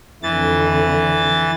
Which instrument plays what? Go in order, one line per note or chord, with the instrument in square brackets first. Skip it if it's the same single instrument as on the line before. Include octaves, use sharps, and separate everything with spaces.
[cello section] F2 D3 [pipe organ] E3 A6